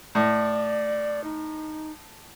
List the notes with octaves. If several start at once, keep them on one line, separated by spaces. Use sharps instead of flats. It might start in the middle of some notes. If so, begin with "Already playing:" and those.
A2 D5
D#4